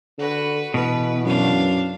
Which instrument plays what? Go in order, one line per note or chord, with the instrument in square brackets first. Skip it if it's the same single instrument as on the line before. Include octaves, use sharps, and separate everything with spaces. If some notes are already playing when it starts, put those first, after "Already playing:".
[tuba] D3 [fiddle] F#4 B4
[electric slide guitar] B2 [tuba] E3 [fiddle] B4
[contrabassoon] F#2 [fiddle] D4 F5